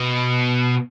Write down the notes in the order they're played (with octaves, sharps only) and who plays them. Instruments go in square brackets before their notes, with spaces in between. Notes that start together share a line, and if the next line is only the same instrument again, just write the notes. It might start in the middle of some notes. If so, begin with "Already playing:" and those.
Already playing: [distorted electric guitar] B2